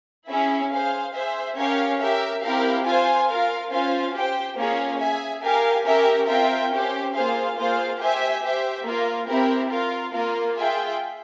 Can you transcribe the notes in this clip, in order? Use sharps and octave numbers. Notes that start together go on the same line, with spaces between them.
C#4 E4 G#4 E5
G#4 C5 F5
G#4 C5 E5
C#4 G4 A#4 C#5 F5
G4 A#4 E5
C4 E4 G4 A#4 F5
F4 C5 F5 G#5
F4 A#4 F5
C#4 F4 C5 F5 G#5
G4 C5 G5
A#3 C#4 F4 G#4 C#5
G#4 E5 G#5
G4 A#4 F5 G#5
C#4 G4 A#4 E5
C4 F4 A#4 E5 G5
C#4 G4 C5
A#3 F4 G#4 C5 F5
A#3 F4 G#4 C5 F5
G4 C5 E5 G#5
G4 C5 E5
A#3 F4 A#4
C4 E4 G4 A#4
F4 A#4 F5
A#3 F4 A#4
F4 G#4 E5 G5